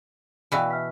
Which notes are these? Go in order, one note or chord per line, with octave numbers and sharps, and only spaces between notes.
B2 E3 D5 F5 G5
E5 F6 B6